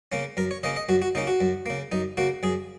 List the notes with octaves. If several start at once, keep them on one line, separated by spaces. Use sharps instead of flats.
C#3 A#3 C#4
F#2 A#4
C#5
C#3 A#3 C#4 D#5
D#5
F#2 F#4
F#4
C#3 A#3 C#4 D#4
F#4
F#2
C#3 A#3
F#2 D#4
C#3 A#3 F#4
F#2 G#4